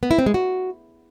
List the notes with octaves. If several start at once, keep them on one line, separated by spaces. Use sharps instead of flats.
B3
E4
C4
G#3
F#4